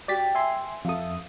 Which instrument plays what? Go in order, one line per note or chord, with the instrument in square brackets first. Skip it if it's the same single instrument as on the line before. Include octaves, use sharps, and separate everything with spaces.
[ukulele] F#4 G4 G5 [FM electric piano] D5 A6 B6
[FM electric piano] E5 G#5 C6
[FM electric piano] F2 D#6 [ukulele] A4 E5 F5